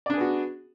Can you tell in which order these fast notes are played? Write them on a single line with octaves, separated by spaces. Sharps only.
D5 D4 G#4 B3 F#4